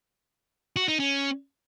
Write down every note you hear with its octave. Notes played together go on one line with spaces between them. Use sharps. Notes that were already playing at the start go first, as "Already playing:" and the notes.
F#4
D#4
C#4